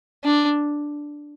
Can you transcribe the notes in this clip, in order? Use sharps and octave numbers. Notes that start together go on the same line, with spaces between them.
D4